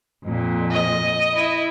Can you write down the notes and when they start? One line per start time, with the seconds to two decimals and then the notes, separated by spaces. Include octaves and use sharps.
0.23 F2 A#2
0.71 D#5
1.33 E4